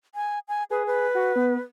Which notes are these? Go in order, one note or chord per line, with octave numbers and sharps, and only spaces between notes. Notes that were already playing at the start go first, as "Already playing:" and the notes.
G#5
G#5
G#4 B4
B4
F#4
B3